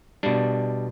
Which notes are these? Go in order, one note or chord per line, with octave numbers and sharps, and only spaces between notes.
B2 G3 D4